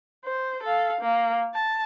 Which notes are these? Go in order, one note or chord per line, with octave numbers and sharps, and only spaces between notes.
C5
A4 F5
A#3
A5